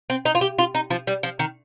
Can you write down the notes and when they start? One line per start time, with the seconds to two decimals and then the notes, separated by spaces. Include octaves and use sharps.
0.10 C4
0.25 D#4
0.35 F4
0.41 G4
0.59 F4
0.75 D#4
0.90 F3
1.07 G3
1.23 F3
1.39 D#3